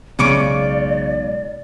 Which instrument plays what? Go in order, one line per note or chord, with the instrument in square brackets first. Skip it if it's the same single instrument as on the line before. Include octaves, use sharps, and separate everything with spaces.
[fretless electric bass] B1 G#3 [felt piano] C#3 C#7 [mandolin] F4 C#6 D6 [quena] D5